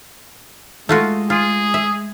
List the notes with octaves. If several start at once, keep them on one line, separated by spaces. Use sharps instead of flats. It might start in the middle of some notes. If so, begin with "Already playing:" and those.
G#3 A3 F4 F#4
F4 G#4
E5